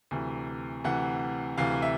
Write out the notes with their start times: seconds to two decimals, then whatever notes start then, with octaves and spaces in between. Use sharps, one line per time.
0.11 D2 C3 E3
0.84 D2 C3 E3 F#5
1.58 D2 C3 E3 F5
1.82 E5